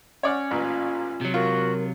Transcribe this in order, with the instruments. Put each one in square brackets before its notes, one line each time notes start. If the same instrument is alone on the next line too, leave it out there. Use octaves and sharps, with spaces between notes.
[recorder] C#4 [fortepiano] C#5 D5 F#5
[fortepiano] A1 A#2 B4 [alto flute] F4
[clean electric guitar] C3 F#3
[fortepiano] F4 [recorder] F#4 [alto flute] A#4